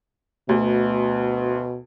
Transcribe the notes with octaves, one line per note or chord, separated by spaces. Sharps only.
D2 B2